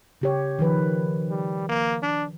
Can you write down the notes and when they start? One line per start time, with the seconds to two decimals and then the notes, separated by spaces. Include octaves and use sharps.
0.22 C#3 G4 C#5
0.59 D#3 F3 B4
1.30 G3
1.69 A#3
2.03 D4